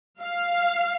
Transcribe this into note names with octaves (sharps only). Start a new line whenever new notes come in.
F5